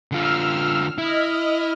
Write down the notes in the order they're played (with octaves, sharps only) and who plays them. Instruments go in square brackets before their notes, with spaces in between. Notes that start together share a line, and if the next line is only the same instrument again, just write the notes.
[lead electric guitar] D3 F4 [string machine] E6 F6
[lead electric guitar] E4 [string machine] D#5 F6